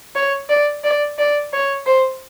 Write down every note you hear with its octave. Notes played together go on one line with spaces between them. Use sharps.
C#5
D5
D5
D5
C#5
C5